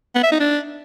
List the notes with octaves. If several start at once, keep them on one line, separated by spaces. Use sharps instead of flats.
B3
E5
D#4
D4